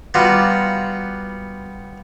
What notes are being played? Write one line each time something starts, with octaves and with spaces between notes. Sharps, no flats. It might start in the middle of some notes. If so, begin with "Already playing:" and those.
G3 B3 F4 F#4 A#5